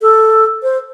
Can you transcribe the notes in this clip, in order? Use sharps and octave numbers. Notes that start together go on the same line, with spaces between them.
A4
C5